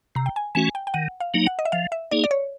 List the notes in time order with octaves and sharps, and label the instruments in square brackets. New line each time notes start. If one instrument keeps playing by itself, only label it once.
[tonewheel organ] C3 [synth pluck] A#5
[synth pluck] G5
G#5
[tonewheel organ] E3 A3 C#4 F#4 [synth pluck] G#5
[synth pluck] G5
G5
[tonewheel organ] D#3 [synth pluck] F#5
[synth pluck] F5
[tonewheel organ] F#3 A#3 D#4
[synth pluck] F#5
D#5
E5
[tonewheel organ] F3 [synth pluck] F5
[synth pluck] E5
[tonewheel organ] A#3 D#4 G#4 [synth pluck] D5
[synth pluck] D5
C#5